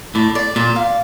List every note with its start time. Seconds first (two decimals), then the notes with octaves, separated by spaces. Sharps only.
0.15 A2 D5
0.35 D5
0.56 A#2 D5
0.76 F5